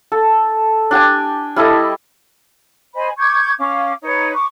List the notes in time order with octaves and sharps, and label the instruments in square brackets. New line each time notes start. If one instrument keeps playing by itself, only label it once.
[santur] A4
D4 G4 G5 G#5
G3 E4 A4 D#5
[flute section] C5 D#5 G#5 B5
C#6 D6 G6 G#6
C#4 F5 D6
D#4 B4 C#5
C#6 D6